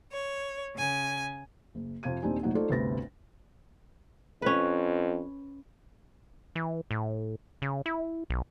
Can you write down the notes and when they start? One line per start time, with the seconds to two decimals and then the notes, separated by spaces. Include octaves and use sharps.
0.11 C#5
0.74 C#3 G#5
1.75 F#1
2.03 F2 C3 F5 G#6 D#7
2.22 D#1 C4 D4 D#4 G4 G#5
2.43 F1 A#1 F#3 D#4 F#5
2.55 A3 D#4 F4 A4 C5 D5
2.69 G1 D2 C3 B4 A6 A#6
4.42 F2 C#4 B4
6.55 E3
6.91 A2
7.62 C#3
7.86 E4
8.30 B1